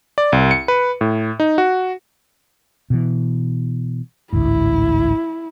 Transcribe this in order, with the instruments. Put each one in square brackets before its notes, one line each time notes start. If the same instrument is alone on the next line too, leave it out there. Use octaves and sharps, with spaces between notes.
[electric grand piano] D5
C2
C#7
B4
A2
D#4
F#4
[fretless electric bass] B2 E3
[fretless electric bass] A1 D2 G#2 [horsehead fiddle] E4